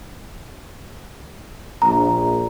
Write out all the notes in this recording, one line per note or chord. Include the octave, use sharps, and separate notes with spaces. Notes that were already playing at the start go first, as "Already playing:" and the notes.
A#1 A#5